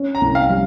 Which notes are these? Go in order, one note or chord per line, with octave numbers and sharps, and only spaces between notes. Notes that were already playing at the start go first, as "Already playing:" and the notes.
Already playing: C#4
A#5
C2
F5
G3